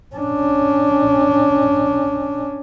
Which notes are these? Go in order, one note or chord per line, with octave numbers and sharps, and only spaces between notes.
C#4 D4